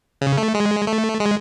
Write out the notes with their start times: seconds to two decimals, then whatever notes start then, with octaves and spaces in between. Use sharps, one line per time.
0.21 C#3
0.38 A3
0.55 G#3
0.87 A3
1.20 G#3